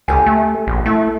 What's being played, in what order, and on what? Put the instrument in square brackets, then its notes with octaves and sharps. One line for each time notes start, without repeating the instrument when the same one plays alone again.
[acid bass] C#2 [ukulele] G4 A4 G#5
[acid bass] A3
A#1
[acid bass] A3 [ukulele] E4